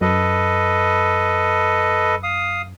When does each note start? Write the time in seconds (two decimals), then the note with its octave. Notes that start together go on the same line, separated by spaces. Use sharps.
0.01 F#2 A4 B4 D#5
2.23 F5 D#6